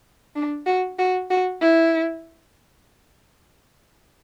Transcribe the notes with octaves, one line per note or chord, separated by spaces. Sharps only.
D4
F#4
F#4
F#4
E4